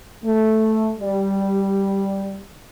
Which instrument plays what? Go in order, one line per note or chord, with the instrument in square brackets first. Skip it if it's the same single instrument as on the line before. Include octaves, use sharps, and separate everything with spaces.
[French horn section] A3
G3